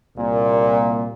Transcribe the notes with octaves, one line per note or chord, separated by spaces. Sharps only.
C2 A#2